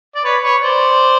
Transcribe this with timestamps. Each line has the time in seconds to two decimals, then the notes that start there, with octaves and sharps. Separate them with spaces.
0.15 D5
0.24 B4 C#5
0.43 B4 C#5
0.61 C5 D5